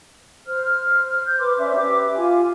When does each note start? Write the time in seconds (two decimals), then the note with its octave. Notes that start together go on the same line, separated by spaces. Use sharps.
0.46 C5 F6
1.26 G6
1.39 B4 C6 D6
1.59 C#4 C5 D5 E5
1.76 G4 B4 E5 D6
2.17 F4 G#5